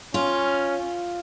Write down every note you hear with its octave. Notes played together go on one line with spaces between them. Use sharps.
C#4 F4